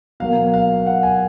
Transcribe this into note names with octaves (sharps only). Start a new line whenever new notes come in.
B2 F#3 A#3 F5
F5
F#5
G#5